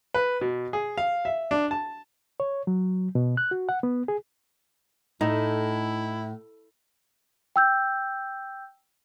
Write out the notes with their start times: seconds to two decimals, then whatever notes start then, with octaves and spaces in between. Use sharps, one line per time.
0.14 B4
0.41 B2
0.73 G#4
0.98 F5
1.25 E5
1.51 D4
1.71 A5
2.40 C#5
2.67 F#3
3.15 B2
3.37 F#6
3.51 F#4
3.69 F#5
3.83 B3
4.08 G#4
5.21 A2 D#4 E4
7.56 G5 E6 G6